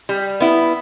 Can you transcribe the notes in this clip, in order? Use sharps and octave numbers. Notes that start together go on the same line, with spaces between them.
G3
B3 E4